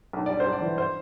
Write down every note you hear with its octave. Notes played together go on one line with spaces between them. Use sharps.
B1
G3 D5
C5
G3
D5
E3
C5